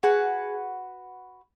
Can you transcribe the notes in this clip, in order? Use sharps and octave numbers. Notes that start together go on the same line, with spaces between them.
F#4 G#4 B4 F#5